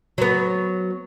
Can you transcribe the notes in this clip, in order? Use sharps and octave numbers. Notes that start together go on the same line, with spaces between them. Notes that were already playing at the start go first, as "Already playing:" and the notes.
F#3 B3